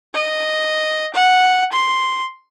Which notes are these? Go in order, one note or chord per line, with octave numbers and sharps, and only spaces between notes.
D#5
F#5
C6